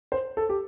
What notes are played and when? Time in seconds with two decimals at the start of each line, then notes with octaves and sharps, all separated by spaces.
0.12 C5
0.37 A4
0.49 G4